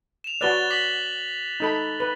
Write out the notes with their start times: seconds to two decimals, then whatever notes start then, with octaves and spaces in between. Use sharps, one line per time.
0.24 E7 F7
0.41 F#4 B4 D5 F#6 A6 G7
0.70 D6 B6 F#7
1.60 D#4 A4 B5
2.00 B4